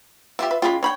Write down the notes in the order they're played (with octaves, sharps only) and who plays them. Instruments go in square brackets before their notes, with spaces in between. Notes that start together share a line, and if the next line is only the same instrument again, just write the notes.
[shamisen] B3 G4 [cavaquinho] F4 E5
[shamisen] B4
[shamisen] C#3 G#3 G5 [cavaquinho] F4 B5
[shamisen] D4 B5 [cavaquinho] C#5 G5